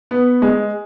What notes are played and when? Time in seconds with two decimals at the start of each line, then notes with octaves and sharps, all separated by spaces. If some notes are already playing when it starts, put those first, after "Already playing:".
0.11 B3
0.42 G#3